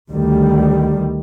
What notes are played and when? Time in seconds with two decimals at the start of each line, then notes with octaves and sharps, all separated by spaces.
0.10 D2 D#3 G3